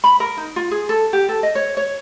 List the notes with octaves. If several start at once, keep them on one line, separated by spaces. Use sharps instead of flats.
B5
A#4
D#4
F4
G#4
A4
G4
A4
D#5
C#5
C#5